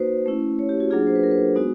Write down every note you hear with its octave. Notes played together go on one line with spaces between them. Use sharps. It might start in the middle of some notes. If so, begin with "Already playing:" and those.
Already playing: A#3 D#4 F#4 B4 C5
A3 C#4 E4
C#5
G4
F#4
F#3 A#3 D4 F4 G#4
C5
B4
A#4
B4
G#3 B3 D#4 F#4